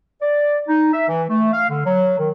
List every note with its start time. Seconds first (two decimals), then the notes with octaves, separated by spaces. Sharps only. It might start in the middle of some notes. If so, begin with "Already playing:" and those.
0.21 D5
0.67 D#4
0.92 E5
1.08 E3
1.29 A3
1.53 F5
1.69 D3
1.85 F#3
2.18 D#3